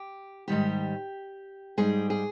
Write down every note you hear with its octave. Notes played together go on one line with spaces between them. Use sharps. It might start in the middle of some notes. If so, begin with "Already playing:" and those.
Already playing: G4
G#2 D#3 G3 G4
G#2 G3 G#4
G#4